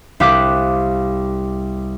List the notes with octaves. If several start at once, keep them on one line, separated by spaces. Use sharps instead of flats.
C2 G4 F5 D6 F#6 B6